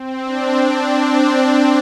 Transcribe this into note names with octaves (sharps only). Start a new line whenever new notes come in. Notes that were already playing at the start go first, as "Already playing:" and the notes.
Already playing: C4
D4
D4
C4